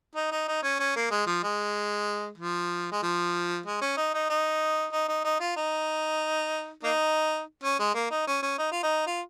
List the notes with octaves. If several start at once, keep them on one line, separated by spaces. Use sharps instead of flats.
D#4
D#4
D#4
C#4
C#4
A#3
G#3
F3
G#3
F3
G#3
F3
G#3
C#4
D#4
D#4
D#4
D#4
D#4
D#4
F4
D#4
A#3 D#4
C#4
G#3
A#3
D#4
C#4
C#4
D#4
F4
D#4
F4